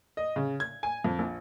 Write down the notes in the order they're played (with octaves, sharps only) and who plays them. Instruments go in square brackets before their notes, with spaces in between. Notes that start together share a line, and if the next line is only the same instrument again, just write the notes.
[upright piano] D#5
C#3
G#6
G#5
F2
A#1